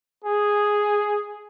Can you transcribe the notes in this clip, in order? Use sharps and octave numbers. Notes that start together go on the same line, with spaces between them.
G#4